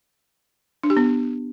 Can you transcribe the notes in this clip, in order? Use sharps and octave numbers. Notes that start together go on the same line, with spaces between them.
D4
G4
B3